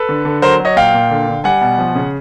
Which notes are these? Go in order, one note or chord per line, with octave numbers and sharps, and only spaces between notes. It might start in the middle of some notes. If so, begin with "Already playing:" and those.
Already playing: A4 B4
D3
D3
F#3 A#4 C5
F#3
C#5 D#5
A#2 F5 G5
A#2
D3
D3
G3 F#5 G#5
B2
F3
C#3